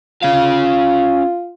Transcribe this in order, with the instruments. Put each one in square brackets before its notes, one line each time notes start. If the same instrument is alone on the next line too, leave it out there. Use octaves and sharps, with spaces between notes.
[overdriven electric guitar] C#4 F5 [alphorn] F4